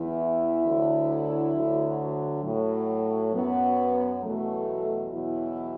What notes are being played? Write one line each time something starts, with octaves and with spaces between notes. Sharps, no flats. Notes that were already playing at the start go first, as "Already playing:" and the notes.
Already playing: E2 E3 E4
D2 D3 F#3
D2 D3 F#3
A2 F#3
F#2 F#3 B3
E2 B2 F#3 A3
E2 B2 F#3 E4